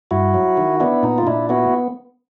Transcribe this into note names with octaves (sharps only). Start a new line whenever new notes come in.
G2 E4 F#4
F#3
D#3
B3 D4 E4
A#2 D#4
F4
A#2 D4 E4
B3 E4 F#4